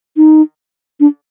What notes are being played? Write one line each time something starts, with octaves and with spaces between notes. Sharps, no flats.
D#4
D4